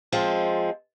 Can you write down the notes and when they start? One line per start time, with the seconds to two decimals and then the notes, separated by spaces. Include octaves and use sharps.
0.12 F3 G#3 C4